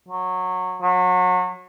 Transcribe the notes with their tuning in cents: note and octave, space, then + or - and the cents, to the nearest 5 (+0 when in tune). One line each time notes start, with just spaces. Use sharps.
F#3 -15
F#3 -30